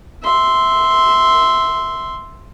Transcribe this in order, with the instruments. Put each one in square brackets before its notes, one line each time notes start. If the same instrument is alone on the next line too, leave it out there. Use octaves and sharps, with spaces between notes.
[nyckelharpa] E5 C6